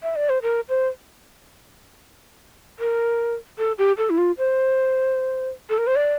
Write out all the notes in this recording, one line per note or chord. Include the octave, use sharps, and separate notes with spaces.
E5
D5
C5
A#4
C5
A#4
A4
G4
A4
E4
F4
C5
A4
A#4
C5
D5